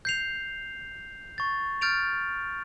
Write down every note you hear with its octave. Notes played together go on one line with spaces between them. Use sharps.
G6 C7 F7
C#6 A6
F6 G6 A6 D7 F7